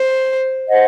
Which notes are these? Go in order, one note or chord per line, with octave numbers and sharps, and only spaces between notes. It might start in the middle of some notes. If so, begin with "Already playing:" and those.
Already playing: C5
C5 D#5 F#5